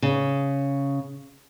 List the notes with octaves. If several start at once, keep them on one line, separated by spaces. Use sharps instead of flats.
C#3